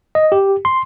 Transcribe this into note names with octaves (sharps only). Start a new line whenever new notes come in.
D#5
G4
C6